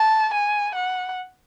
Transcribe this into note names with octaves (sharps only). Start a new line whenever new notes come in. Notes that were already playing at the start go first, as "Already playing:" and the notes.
Already playing: A5
G#5
F#5